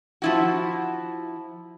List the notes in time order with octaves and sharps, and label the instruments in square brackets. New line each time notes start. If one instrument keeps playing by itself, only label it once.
[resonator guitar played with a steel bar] F3 E4 F#4